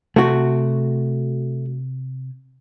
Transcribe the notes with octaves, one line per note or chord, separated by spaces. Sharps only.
C3 A3 F#4